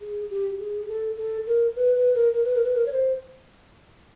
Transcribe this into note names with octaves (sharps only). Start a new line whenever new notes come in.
G#4
G4
G#4
G#4
A4
A4
A#4
B4
B4
A#4
A#4
B4
A#4
B4
A#4
C#5
C5